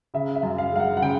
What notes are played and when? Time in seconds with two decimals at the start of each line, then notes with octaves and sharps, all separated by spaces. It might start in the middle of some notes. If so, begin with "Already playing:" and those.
0.14 C#3 E5
0.35 E5
0.43 F#2
0.58 F5
0.72 G#3 F5
0.80 F#5
0.97 F#5
1.02 C#3 G5